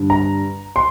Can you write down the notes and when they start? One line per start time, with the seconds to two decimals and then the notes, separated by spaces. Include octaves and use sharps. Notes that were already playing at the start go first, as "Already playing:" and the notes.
Already playing: G2 D3 G3
0.10 A#5
0.76 C6